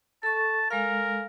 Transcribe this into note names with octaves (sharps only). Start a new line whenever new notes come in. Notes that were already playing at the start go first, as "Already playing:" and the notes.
A4 A5 C#6
G#3 A4 A#4 F5